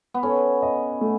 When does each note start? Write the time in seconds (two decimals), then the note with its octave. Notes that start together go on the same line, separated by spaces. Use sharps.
0.14 B3
0.23 C#4 A4
0.62 D#5
1.01 A3